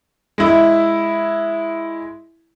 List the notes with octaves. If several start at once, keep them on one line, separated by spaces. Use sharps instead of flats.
G#3 E4